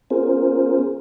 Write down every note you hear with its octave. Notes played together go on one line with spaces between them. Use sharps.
B3 C#4 F4 G#4 A#4 C5